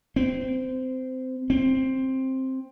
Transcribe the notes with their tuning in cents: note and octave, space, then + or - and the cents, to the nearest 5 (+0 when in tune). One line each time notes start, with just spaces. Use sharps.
C4 -20
C4 +10